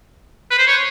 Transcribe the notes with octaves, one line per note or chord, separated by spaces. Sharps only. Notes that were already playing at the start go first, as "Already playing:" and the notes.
B4
C5
C#5